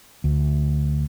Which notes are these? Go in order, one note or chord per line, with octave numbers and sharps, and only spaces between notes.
D2